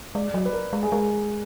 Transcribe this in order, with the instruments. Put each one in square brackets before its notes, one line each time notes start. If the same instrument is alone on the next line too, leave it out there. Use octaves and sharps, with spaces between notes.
[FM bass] G#3 [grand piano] D5
[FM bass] F#3 [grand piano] D5
[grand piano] B4
A#4
[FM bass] G#3
[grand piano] G#4
[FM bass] G#3 [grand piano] A#4